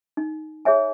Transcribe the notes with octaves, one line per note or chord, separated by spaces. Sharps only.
D#4
G#4 C#5 E5 G#5